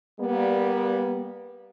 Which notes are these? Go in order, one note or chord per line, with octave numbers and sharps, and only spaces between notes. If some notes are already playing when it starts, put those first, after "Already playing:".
G3 A#3 B3